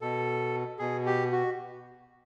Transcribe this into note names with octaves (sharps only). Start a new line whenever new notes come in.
B2 A4
B2 G#4
G4
F#4